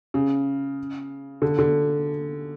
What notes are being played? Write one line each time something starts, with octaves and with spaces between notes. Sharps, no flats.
C#3
D3
D3